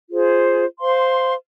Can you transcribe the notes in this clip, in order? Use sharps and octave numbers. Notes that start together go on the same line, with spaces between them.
F4 G#4 C5
C5 F5 C6